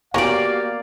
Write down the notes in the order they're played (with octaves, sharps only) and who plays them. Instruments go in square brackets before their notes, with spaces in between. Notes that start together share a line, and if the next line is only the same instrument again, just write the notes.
[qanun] A#3 D5 [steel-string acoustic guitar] B3 F#4 G4 [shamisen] C#4 A#4 [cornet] F5